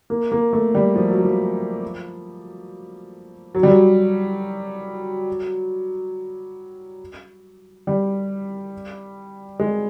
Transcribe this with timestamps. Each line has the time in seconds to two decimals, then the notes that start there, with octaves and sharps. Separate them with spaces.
0.10 A#3
0.32 A#3
0.53 A3
0.75 G3
0.96 F3
1.10 F#3
1.23 F3
3.55 F#3
3.63 G3
3.70 F#3
7.87 G3
9.59 G#3